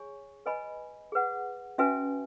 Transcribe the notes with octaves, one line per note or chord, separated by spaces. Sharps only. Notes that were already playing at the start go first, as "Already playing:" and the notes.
Already playing: G#4 C#5 G#5 C#6
B4 D#5 G#5 B5
G#4 B4 F#5
C#4 F#4 B4 E5 G#5